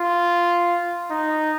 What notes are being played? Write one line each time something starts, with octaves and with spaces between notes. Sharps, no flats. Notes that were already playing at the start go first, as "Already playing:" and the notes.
Already playing: F4
D#4